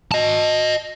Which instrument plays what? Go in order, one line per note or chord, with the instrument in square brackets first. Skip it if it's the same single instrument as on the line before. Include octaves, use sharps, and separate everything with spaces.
[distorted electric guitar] D#5 A5